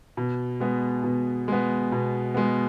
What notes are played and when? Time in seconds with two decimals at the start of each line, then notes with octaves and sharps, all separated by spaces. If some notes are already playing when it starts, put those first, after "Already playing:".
0.17 B2
0.60 G#3 B3
1.04 B2
1.48 G#3 B3
1.92 B2
2.34 G#3 B3